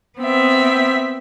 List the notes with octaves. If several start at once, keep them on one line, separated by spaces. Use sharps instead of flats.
B3 C4 E5